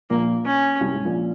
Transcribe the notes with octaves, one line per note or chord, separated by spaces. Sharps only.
A#1 A#2 A#3
C#4
C2 C3
G#2
A#1 A#2